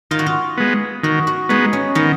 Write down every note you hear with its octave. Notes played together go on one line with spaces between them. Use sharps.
D#3 F4
F#4
F4
G#3 B3
D#3 F#4
F#4
G#3 B3 D#4
C#4
D#3 B3